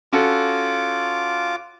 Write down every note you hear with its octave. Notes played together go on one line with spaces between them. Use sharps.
C#4 F4 F#4 A4 D6